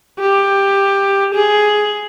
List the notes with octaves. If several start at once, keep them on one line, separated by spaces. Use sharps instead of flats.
G4
G#4